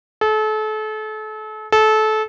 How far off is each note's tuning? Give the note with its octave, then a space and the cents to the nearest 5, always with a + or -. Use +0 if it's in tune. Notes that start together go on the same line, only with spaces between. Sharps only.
A4 -35
A4 -25